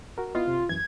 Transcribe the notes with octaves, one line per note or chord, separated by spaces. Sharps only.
F#4 A#4
B3 E4 F4 D#5
C3
F#2 E3 G#6